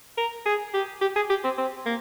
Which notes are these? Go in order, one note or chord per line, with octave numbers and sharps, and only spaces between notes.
A#4
G#4
G4
G4
G#4
G4
C4
C4
A#3